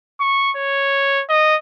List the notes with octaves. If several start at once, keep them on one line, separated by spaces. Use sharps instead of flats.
C#6
C#5
D#5